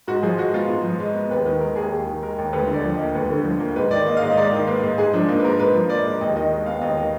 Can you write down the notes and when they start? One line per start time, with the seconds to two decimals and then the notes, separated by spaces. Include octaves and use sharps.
0.08 G#2 F#4
0.23 F3 G#4
0.38 G#3 F#4
0.54 B3 F4
0.69 G#2
0.84 F3
1.00 G#3
1.14 B3
1.31 D#2 B4
1.46 D#3 B4
1.60 G#3 A#4
1.76 D#2 G#4
1.92 D#2 G#4
2.07 D#3
2.22 G#3 A#4
2.38 D#2
2.53 D2 B4
2.68 D3
2.74 D5
2.84 F3
2.94 D#5
3.00 A#3
3.15 D2 B4
3.30 D3
3.45 F3
3.60 A#3
3.76 G#2 B4
3.91 D#3 D5
4.06 A#3 D#5
4.17 F5
4.21 G#2 D#5
4.32 D#5
4.37 G#2 D5
4.52 D#3
4.67 A#3 B4
4.82 G#2
4.98 G#2 G#4
5.13 F3 D4
5.28 A#3 D#4
5.39 B4
5.44 G#2 A#4
5.59 G#2 B4
5.74 F3
5.90 A#3 D5
6.06 G#2
6.21 D#2 D#5
6.36 D#3 D#5
6.52 G#3 D#5
6.66 B3 F5
6.82 D#2 D#5
6.97 D#3 D#5